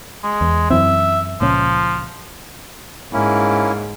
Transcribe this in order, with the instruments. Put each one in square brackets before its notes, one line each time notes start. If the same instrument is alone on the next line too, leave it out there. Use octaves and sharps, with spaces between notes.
[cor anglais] G#3
[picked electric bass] E2
[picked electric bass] F#2 E3 C4 [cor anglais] E5
[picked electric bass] C#2 A#2 C#4 [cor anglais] F3
[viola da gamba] G#2 [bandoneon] A#3 C#4 E4